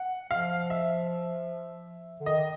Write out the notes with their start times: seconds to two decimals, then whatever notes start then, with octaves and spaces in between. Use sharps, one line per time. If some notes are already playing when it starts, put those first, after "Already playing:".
Already playing: F#5
0.31 F3 F5
0.70 E5
2.20 D3
2.26 D#3 D#5